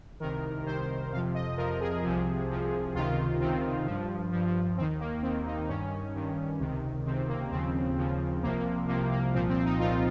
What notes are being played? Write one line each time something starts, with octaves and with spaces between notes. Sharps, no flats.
C2 C3 D#3 A#4
C2 C3 D#3 C5
F2 C3 F3 F5
D#5
F2 C3 F3 A#4
G#4
C2 C3 F3
C2 C3 F3
C#2 C3 D#3 F4
C#2 C3 D#3 C4
G2 F3
G2 F3
D#2 D#3 C4
A#3
D#2 D#3 C4
D#4
G2 D#3 C#4
G2 D#3
C#2 C3 D#3
C#2 C3 D#3 C4
A#3
D#2 C#3 F3 C4
D#2 C#3 F3
C2 C3 F3 A#3
C2 C3 F3 A#3
A#3
C2 A#2 F3 C4
C4
D#4
C2 A#2 F3 F4